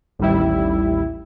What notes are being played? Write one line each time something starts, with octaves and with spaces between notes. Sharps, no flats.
A1 D#2 G3 E4